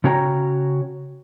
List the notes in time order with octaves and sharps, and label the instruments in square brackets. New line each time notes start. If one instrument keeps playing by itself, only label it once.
[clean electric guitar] C#3 C#4 F#4 C#5 G5 A#5